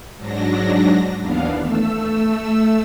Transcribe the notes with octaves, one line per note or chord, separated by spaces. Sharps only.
G#2 F#3 D4 A#6
D#2 E3 B3 D4 F5
A3 E6